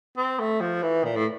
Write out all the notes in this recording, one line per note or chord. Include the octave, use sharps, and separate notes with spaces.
C4
A3
F3
E3
A#2
A2